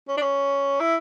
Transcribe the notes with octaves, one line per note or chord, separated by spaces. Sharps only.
C#4
D4
C#4
E4